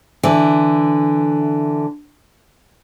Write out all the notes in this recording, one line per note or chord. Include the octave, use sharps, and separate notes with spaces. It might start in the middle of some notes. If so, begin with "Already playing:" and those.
D3 E3